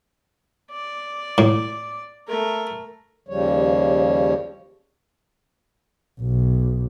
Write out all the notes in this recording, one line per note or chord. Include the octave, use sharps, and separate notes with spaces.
D5
A2
A3 A#4
D#2 C#3 F3 G3 C#5
B1